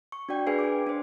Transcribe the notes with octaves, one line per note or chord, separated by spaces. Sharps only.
C#6
D4 F#4 D5 G5
D4 G#4 B4 F5 G#5 C7
D6
D4 C5